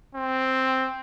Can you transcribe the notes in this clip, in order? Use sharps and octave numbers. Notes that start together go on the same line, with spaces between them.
C4